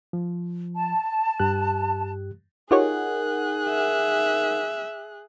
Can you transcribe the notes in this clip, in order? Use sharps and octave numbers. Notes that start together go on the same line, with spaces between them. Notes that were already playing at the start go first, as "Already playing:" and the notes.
F3
A5
G2 G4 F#6
D#4 F4 G4 G#4 A#4 C#5 F#5 F#6
E5